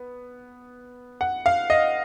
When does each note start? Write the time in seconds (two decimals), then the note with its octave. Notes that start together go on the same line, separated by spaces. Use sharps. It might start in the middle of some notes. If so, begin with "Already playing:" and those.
Already playing: B3
1.21 F#5
1.46 F5
1.70 D#5